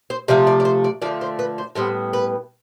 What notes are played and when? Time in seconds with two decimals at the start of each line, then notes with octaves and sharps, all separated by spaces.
0.10 C5
0.28 C3 F3 A3 D5
0.47 D5
0.60 D5
0.65 C5
0.84 D5
1.02 D3 F3 A3 D5
1.21 C5
1.39 B4
1.58 C5
1.75 A2 G3 B3 C5
2.13 B4